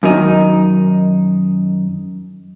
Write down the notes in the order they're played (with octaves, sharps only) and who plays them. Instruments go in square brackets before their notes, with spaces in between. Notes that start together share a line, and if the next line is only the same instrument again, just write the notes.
[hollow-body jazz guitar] F#2 D#3 D#4